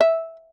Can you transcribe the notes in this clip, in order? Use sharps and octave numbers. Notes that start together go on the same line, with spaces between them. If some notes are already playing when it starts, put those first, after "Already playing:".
E5